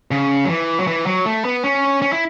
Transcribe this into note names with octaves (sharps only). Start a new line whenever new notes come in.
C#3
F#3
E3
F#3
E3
F#3
A3
B3
C#4
C#4
E4